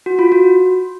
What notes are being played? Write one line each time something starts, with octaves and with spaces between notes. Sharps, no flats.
F#4
F4
F#4